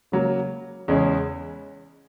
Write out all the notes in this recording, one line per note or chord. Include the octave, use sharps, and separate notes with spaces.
C#3 F#3 A#3
E2 C#3 G#3 C#4